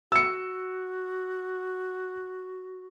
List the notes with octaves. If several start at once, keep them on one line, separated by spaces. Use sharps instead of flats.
F#4 E6 C#7